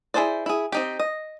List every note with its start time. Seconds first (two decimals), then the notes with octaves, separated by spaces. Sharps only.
0.14 E4 G#4 A4 C5 D5
0.46 E4 G#4
0.72 C4 D#4 G4
1.00 D#5